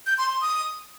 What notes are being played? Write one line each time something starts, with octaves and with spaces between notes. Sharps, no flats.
G6
C6
C6
D#6